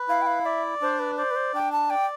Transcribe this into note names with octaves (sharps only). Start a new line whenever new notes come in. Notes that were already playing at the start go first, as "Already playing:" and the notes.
Already playing: B4
E4 F5
G5
F5
D5 E5
D4 C5
B4
C5 D5
B4
C5
D4 G5
A5
D5 G5